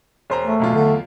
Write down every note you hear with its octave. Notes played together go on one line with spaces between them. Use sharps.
E1 C5 A#5
A3
B1 E2 B2 F4
D3